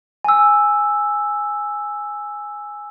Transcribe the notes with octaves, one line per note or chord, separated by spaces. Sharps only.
G#5 E6